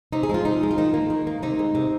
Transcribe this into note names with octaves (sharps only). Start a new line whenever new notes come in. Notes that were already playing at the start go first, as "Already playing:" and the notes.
C3 D#4
G#4
F3 G#3 F4
C3 D#4
F3 G#3
F4
D#3 D#4
A#3
D#3
A#3
C3 D#4
G#3
C3